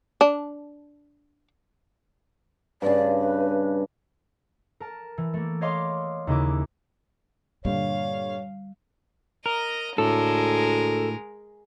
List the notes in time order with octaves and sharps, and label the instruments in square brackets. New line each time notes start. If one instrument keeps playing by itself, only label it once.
[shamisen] D4
[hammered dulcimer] G2 C#3 [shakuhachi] D5
[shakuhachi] B4
[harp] A#4 A5
E3
A3 A#3
C#5 D#5 F5 C6 D6
D#2 C#3 D#4 E4 D6
[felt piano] G2 A#2 D3 [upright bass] G3 [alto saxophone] C#5 [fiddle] F5
[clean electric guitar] A#4 [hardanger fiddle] D#5 A#5
[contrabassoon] D2 [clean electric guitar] A2 [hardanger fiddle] G#3 A#4 [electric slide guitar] A4